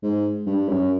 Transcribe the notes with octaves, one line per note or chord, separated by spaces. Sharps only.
G#2
G2
F#2